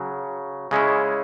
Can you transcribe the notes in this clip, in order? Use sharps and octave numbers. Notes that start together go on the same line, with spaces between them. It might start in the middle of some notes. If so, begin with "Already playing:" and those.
Already playing: C#3 F#3
C#3 G#3 C#4 E4